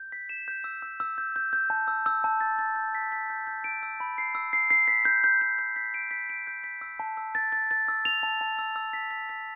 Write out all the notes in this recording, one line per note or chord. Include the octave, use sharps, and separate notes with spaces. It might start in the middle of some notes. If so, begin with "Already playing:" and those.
Already playing: G6
B6
E7
G6
E6
E6
E6
G6
G6
G6
A5
E6
E6
A5
A6
A6
G6
B6
B6
G6
G6
D7
E6
B5
C7
E6
C7
C7
B6
G6
G6
G6
G6
B6
D7
B6
D7
G6
B6
E6
A5
E6
A6
A6
A6
E6
F7
A5
A5
E6
E6
B6
B6
B6